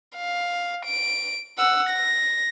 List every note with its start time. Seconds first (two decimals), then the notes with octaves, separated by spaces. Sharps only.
0.16 F5
0.86 D7
1.59 F#5 E6
1.89 A#6